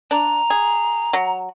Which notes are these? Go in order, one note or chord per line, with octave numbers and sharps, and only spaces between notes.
D4 A#5
G#4
F#3